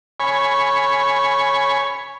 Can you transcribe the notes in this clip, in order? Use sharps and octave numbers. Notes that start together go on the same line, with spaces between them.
C#5 G#5 B5